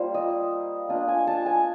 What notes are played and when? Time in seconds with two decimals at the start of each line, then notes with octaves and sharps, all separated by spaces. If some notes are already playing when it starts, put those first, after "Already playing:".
Already playing: G3 A#3 F4 C5
0.14 D#5
0.89 A#3 D4 F4 D#5
1.08 G#5
1.27 A5
1.46 G#5